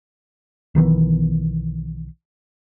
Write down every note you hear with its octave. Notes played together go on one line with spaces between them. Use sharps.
B1 D#3 E3 B3